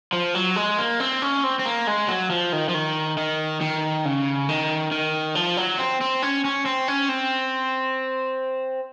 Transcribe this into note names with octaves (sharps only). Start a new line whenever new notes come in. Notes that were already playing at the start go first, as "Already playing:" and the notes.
F3
F#3
G#3
A#3
C4
C#4
C4
C4
A#3
G#3
F#3
F3
D#3
F3
D#3
D#3
D#3
C#3
D#3
D#3
F3
F#3
C4
C4
C#4
C#4
C4
C#4
C4